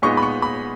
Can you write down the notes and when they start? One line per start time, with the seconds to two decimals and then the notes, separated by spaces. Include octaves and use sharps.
0.02 A#2 G#3 B3 D#4 C#6
0.17 B5
0.22 C#6
0.42 B5